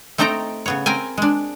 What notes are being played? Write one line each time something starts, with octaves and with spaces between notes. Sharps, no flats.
A3 C4 D#4 A4 G5 A#5
C#3 B3 C#5
C4 A#4 G5 G#5
G#3 D4